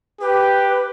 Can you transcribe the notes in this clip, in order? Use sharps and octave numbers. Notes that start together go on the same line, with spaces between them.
G4 B4